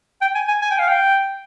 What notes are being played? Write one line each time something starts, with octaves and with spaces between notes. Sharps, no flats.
G5
G#5
G#5
G#5
G5
F5
G5